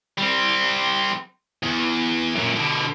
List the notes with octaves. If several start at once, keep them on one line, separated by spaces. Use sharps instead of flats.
G3 C4
E2
F#2 A#2
B2 D3